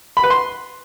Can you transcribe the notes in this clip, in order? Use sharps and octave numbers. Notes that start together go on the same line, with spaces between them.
B5
B4
C6